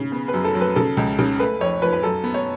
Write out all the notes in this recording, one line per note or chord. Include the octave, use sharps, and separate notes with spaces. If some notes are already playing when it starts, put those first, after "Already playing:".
Already playing: C#3
B3
B4
F#2
A4
F#3
B4
C#3 A4
C#2
C#3
A3 B4
F2 C#5
F3 B4
B4
F#2 A4
B3
C#5